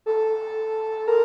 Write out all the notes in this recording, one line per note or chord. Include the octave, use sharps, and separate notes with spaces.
A4
A#4